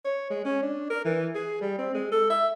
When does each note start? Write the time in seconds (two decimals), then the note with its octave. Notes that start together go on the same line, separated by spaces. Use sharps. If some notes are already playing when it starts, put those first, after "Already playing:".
0.05 C#5
0.30 G#3
0.45 C#4
0.62 D4
0.90 A#4
1.05 E3
1.35 G#4
1.61 G3
1.79 C4
1.94 G#3
2.12 A4
2.30 E5